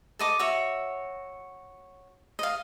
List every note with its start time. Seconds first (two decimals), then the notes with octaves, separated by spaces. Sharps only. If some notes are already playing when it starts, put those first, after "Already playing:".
0.19 A4 D#5 D6
0.39 F#4 C#5 E5
2.39 D#5 F5